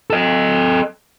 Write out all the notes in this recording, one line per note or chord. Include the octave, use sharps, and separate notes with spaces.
A4 D#5